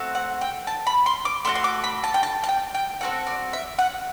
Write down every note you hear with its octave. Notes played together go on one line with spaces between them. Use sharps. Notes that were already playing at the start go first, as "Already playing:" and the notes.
Already playing: A3 C4 F#4
F#5
G5
A5
B5
C6
D6
A3 D4 F#4 C6
C6
D6
B5
A5
G5
A5
A5
G5
G5
C4 F#4 A4 F#5
D5
E5
F#5